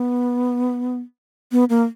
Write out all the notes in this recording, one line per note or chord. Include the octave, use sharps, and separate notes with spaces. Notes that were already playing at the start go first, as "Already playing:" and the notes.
Already playing: B3
B3
A#3